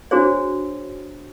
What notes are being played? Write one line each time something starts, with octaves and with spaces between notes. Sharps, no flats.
D4 F#4 G#4 C5 C#5